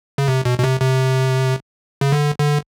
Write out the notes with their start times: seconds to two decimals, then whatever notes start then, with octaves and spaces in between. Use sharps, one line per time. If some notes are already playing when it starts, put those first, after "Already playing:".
0.18 C#3
0.28 C3
0.45 B2
0.58 B2
0.64 C3
0.81 C3
2.01 C#3
2.12 D3
2.39 D3